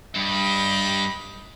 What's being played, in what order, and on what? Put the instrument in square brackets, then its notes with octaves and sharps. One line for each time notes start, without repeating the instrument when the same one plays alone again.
[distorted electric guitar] G2 [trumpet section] G4 D#5 B5